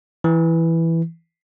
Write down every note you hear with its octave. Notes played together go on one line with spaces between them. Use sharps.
E3